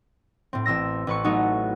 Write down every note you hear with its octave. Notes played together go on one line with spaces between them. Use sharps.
A2 C4
A1 C4 E6 A#6
A1 B4 C#6
F#3 A3 B3 D#4 F#4